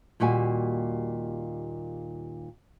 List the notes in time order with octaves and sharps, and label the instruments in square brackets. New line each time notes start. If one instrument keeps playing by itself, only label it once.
[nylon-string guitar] D#2 A#2 G3 F#4 G#5